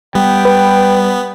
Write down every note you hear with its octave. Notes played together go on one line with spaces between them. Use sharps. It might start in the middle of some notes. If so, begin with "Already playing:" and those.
G3 B3 G5
B4